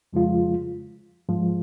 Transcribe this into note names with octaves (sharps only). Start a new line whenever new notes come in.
F2 C#3 F3 G#3 F4
G#2 F3 G#3 F4